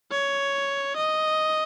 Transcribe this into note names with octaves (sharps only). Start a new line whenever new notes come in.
C#5
D#5